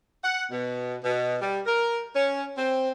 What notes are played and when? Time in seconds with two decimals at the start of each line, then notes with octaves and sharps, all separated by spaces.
0.24 F#5
0.51 B2
1.04 B2
1.42 G3
1.66 A#4
2.15 C#4
2.57 C4